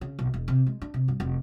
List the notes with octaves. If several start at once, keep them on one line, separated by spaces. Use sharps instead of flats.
C#3
B1
E1
C3
G#3
D4
C3
G2
F1